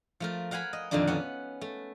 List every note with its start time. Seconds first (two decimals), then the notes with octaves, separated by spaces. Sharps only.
0.20 F3 A3 A#4
0.51 A#4 F5 F#5 G#5 B5
0.73 D#5
0.91 F2 A#2 D3 D#3 A#3 D4
1.07 B3 C#4 F#5
1.61 A3